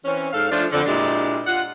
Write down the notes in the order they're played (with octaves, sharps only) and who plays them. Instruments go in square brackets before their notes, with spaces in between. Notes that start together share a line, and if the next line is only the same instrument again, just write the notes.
[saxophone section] E3 C4 C#4
G#2 A4 F5
F3 A3 D4 F4
F2 D3
A#2 G#3 D4 E4 G4
F4 F#5